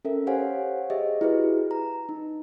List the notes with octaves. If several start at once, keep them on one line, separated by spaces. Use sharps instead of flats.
C#4 A4 A#4 E5
G4 C5 C#5 F5 F#5 G#5
G4 G#4 D#5 E5
E4 F#4 G#4 B4
A#5
D#4